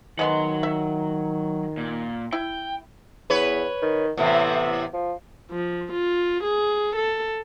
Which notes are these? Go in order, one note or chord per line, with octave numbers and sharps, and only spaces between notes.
D#3 F#3 G#3 B3 F#5 C6
E5
A#2
E4 G5
E2 B4 C#5
D#3
A2 C3 E3 B3
F3
F3
F4
G#4
A4